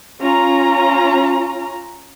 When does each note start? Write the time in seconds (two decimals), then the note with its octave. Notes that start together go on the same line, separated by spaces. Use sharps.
0.22 C#4 F4 A#5